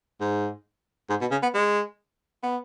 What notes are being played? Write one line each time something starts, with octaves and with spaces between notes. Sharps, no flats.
G#2
G#2
B2
C#3
B3
G#3
B3